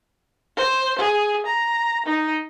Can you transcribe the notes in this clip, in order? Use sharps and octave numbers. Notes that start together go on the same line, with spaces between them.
C5
G#4
A#5
D#4